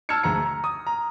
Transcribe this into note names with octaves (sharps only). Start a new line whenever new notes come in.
A5 E6 F6 G6 G#6 C#7
D2 G#3 A#5 C#7
A#5
D#6
A#5